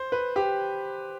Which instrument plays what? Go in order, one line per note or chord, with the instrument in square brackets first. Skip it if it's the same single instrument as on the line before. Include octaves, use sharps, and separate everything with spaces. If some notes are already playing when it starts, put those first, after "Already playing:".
Already playing: [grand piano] C5
B4
G4